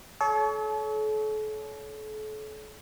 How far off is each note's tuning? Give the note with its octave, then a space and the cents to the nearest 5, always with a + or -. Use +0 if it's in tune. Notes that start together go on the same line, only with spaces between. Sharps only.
A4 -40 C#5 +25